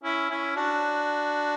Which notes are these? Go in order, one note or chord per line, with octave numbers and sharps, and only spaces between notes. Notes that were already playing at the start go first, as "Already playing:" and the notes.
C#4 E4
C#4 E4
D4 F#4